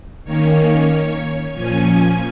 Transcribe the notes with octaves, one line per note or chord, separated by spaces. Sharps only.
D#3 A#3 C#4 C#5
A#2 F3 C#4 G#5